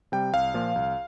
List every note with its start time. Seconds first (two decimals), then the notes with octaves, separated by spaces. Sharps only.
0.12 C3 G3 G5
0.34 C2 F5
0.54 A#2 F3
0.76 C2